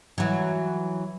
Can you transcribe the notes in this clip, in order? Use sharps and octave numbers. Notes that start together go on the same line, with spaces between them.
E3 F#3